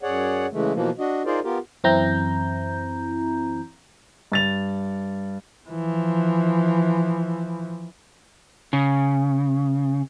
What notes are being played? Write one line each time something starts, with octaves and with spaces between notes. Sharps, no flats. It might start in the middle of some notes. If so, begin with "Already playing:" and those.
F#2 G#4 C#5 D5 F#5
C#3 E3 G#3 A3
B2 E3 F3 A#3
D4 F#4 D#5
D#4 F4 G#4 A#4 C5 D5
B3 F4 G4 A#4
F#2 E3 C4 E4 A#5 G6
G2 A6 F7
E3 F3
C#3